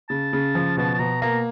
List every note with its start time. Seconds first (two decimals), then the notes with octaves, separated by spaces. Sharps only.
0.09 C#3 A5
0.33 C#3
0.55 F3
0.77 B2 A5
0.94 A5
0.99 B2 A#5
1.22 A#3 A#5